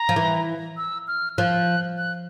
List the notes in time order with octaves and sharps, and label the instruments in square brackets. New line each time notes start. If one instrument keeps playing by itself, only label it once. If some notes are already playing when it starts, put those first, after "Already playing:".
Already playing: [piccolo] A#5
[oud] F3
E3
[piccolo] E6
F6
[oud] F3 [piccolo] F#6
[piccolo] F#6